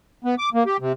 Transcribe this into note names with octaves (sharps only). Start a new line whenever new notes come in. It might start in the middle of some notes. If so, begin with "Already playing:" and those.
B3
D6
A#3
G4
C3